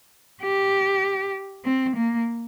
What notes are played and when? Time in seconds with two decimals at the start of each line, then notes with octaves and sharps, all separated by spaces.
0.42 G4
1.65 C4
1.96 A#3